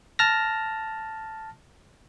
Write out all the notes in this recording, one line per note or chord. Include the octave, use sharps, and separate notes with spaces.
A5 F6 A#6